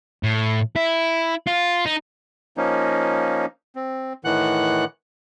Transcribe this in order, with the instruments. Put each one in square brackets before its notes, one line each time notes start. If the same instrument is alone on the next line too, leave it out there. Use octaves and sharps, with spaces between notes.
[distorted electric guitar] A2
E4
F4
D#4
[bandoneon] F3 A#3 C#4 D#4
C4
A2 D#3 E3 F#5 F#6